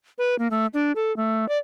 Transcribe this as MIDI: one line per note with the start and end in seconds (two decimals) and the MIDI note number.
0.18 0.37 71
0.39 0.48 58
0.51 0.66 57
0.74 0.92 62
0.96 1.15 69
1.17 1.48 57
1.49 1.58 74